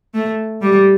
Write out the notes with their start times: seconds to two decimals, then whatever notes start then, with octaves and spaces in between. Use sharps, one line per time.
0.14 A3
0.62 G3